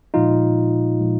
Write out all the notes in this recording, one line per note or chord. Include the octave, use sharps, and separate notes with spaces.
A#2 F3 G#3 D#4 F4
A#2 F3 G#3